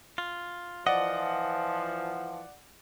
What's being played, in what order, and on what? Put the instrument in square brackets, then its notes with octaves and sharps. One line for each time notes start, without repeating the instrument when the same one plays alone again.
[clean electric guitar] F4
[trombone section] E3 F3 [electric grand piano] D5 F#5 [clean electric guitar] D#5